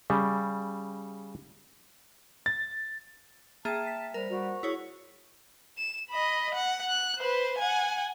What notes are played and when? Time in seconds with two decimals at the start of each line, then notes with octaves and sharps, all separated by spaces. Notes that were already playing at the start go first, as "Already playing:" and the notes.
0.10 C#3 G3
2.46 A6
3.65 A#3 G#4 E5 G5 A5 A6
3.87 B6
4.14 G3 A#4 C5 A#5
4.29 G3 F#4
4.63 E4 G#4 C#5
5.78 E7
6.10 D#5 B5
6.54 F#5
6.88 F#6
7.19 B4 C5
7.58 F#5 G#5